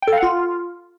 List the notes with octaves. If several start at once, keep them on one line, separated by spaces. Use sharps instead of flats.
G5
A4
F5
F#5
F4